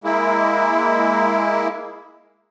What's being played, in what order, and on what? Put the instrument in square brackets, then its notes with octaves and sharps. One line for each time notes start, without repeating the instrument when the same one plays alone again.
[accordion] G#3 A#3 E4